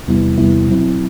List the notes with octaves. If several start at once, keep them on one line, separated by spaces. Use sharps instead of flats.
E2 C3 G3 B3 E4
E2 C3 G3 B3 E4
B2 F#3 C4 E4